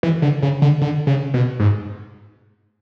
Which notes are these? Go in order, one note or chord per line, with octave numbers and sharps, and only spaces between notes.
E3
D3
C#3
D3
D3
C#3
B2
G#2